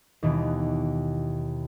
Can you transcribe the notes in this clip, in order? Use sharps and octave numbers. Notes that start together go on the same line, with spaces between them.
D#2 B2 E3